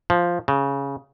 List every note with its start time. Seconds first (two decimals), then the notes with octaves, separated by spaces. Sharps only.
0.10 F3
0.48 C#3